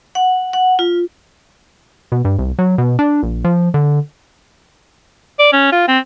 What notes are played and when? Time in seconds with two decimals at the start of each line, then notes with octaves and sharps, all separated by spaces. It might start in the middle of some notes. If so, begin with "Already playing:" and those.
0.15 F#5
0.53 F#5
0.79 F4
2.12 B2
2.25 G2
2.39 C2
2.59 F#3
2.78 B2
2.99 D4
3.23 A#1
3.44 F3
3.74 D3
5.39 D5
5.53 C#4
5.72 F4
5.88 C4